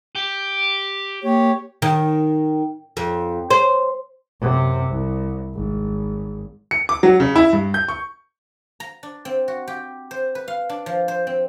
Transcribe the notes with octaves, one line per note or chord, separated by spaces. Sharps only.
G4
A#3 G4 C#5
D#3
F2
C5
F#2 C3
C2
G#1
C#7
D6
F#3
C#3
E4
G2
G6
C#6
A#5
D4
C4
F#4
G4
C5
B4
F5
D4
F3
C5
C4